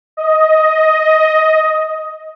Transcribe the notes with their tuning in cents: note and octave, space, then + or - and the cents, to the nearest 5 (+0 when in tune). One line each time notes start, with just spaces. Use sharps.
D#5 +10